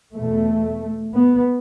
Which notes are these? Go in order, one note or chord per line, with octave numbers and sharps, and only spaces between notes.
E2 B2 A3
B3